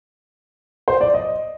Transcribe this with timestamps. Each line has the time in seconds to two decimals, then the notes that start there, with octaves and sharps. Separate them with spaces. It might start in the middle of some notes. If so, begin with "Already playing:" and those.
0.88 C5
1.01 D5
1.14 D#5